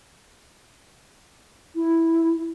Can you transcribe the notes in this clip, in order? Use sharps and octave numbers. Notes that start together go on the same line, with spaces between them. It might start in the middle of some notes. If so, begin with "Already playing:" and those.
E4